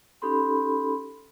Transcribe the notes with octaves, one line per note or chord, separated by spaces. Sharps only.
C#4 D#4 G4 A4 B5 C6